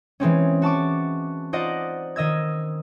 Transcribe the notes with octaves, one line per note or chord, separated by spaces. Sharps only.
E3 G#3 C4 C#4
F#4 A5 C#6 D6
D#4 F4 C5 D5 D#5 F#5
D#3 D#5 E6 G#6